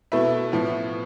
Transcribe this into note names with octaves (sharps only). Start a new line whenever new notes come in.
B2 A3 E4 B4 E5
A2 F3 B3